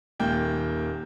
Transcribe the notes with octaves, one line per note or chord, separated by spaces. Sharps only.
D#1 A#3 G5 G6